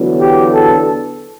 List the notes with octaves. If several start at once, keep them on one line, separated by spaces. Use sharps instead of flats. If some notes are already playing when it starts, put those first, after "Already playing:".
Already playing: E2 D3 F#3 B3
G4
A4